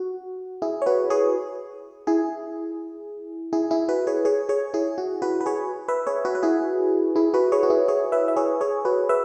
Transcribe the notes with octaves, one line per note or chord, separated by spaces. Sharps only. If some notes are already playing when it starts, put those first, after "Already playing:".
Already playing: F#4
E4 G#4
C#5
F#4 B4
G#4 C#5
E4 G#4
E4 G#4
E4 G#4
F#4 B4
G#4 C#5
G#4 C#5
G#4 C#5
E4 G#4
F#4
F#4 B4
B4
G#4 C#5
B4 E5
G#4 C#5
F#4 B4
B4
E4 G#4
E4 G#4
F#4 B4
G#4 C#5
F#4
E4 G#4
G#4 C#5
B4 E5
E5
G#4 C#5
G#4 C#5
F#4 B4
B4 E5